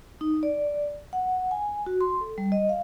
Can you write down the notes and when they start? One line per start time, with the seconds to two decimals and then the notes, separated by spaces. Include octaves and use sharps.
0.21 D#4
0.43 D5
1.13 F#5
1.51 G#5
1.86 F#4
2.01 C6
2.21 A4
2.38 G3
2.52 D#5
2.69 F5